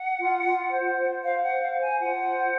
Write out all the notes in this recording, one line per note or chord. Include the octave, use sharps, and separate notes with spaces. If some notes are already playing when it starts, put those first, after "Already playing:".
Already playing: F#5
F4
F4
C5
C5
C5 F5
F#5
C5
F5
C5
G#5
F4 F#5
C5